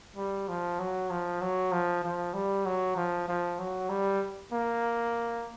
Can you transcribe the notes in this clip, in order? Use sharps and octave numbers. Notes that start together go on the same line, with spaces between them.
G3
F3
F#3
F3
F#3
F3
F3
G3
F#3
F3
F3
F#3
G3
A#3